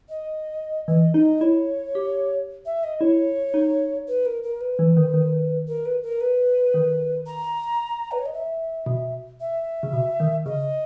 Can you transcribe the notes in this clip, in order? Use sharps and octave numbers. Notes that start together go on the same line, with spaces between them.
D#5
E3 D#5
D#4 D#5
E4 C#5
G4
E5
D#5
E4 C#5
D#4
B4
A#4
A#4
B4
E3
D#3
D#3
A#4
B4
A#4
B4
D#3
A#5
B4
C#5
D#5
E5
B2
E5
C#3
B2
D#3
C#3 D#5